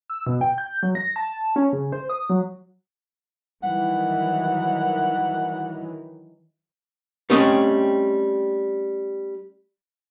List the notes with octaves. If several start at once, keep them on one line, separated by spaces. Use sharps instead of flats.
E6
B2
G5
G6
F#3
A#6
A5
C#4
C#3
C5
D#6
F#3
D#3 E3 F#3 G3 F#5
G3 A3 C4 C#4 D#5